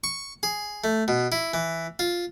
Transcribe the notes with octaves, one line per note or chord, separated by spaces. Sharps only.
C#6
G#4
A3
B2
E4
E3
F4